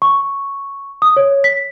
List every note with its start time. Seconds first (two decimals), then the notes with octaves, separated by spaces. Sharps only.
0.02 C#6
1.02 D#6
1.17 C#5
1.44 B6